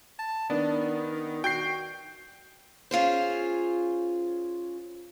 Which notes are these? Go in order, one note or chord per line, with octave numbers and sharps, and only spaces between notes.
A5
D#3 B3 D4
F#4 G5 G6 C7
C#4 F4 G#4 C5